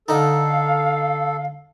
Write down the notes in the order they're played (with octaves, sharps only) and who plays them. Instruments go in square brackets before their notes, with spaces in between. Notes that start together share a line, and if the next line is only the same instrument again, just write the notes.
[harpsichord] D3 D#4 [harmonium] A4 [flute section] F5